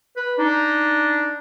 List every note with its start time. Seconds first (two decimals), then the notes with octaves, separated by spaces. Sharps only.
0.16 B4
0.39 D4 D#4